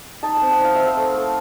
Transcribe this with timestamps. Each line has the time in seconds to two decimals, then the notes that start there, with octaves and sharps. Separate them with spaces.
0.23 D#4 A5
0.36 C4 A5
0.51 F#5
0.61 D#4 F5
0.75 C4 E5
0.86 F5
0.97 A3
1.15 A3